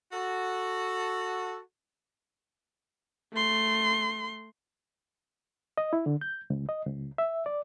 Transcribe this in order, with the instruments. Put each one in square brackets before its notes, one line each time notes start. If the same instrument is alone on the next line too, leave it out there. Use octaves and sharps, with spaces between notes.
[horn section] F#4 A4
[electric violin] A3 C6
[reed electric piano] D#5
E4
D3
G6
C#2
D#5
C#2
E5
D5